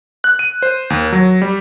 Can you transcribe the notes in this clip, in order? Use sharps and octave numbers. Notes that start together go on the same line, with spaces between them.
F#6
D#7
C5
D#2
F#3
G3